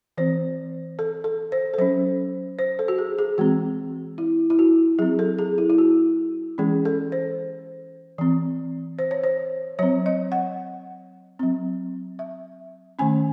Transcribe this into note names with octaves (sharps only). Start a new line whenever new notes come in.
E3 C4 C5
A4
A4
C5
A4
F#3 C#4 C5
C5
A4
F#4
G#4
G#4
E3 G#3 C4 F#4
E4
E4
F#4
F#3 C4 G#4
A4
G#4
E4
E4
F#4
E3 G#3 C#4 G#4
A4
C5
E3 C4
C5
C#5
C5
F#3 C4 C#5
D#5
F#5
F#3 C4
E5
D#3 A3 C#4 G#5